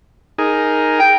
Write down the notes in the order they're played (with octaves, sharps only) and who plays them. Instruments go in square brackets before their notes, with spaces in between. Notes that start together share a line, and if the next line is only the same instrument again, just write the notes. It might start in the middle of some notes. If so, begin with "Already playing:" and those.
[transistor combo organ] D#4 G#4 A#4
[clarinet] G5